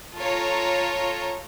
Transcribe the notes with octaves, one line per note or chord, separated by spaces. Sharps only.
F4 A4 C#5 A#5